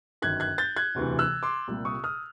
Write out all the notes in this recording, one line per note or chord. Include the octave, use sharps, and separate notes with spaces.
G1 F#2 D#3 F#6 G#6
F#6 G#6
G6 A6
F#6 G#6
E1 D2 C3 E3
E6 F#6
C6 D6
C2 A#2 G3
C#6 D#6
D#6 F6